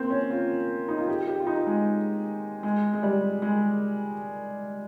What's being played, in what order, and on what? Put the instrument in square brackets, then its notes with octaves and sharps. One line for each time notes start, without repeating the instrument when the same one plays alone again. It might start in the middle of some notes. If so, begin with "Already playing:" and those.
Already playing: [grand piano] A#3 C4
C#4
F4
D#4
F4
G4
G4
F4
D#4
G#3
G#3
G#3
G3
G#3